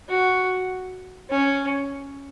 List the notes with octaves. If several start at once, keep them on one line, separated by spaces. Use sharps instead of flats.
F#4
C#4